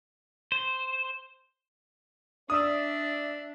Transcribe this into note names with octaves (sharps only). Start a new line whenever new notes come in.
C5
D4 D5 E5 D#6 E6